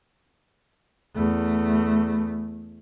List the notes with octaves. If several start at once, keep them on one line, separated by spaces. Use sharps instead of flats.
E2 A3